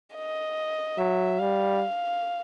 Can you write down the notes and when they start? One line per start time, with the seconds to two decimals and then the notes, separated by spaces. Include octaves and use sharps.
0.15 D#5
0.98 F#3 E5
1.39 G3 F5